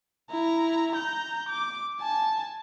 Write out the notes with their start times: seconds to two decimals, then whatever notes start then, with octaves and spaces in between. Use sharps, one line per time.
0.31 E4 A#5
0.92 A#5 G6
1.49 D6
2.01 G#5 A5